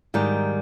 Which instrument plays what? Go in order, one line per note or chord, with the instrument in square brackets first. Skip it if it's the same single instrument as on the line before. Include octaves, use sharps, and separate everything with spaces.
[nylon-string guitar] G#2 D#3 G3